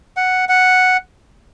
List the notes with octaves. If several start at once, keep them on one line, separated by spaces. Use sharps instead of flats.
F#5
F#5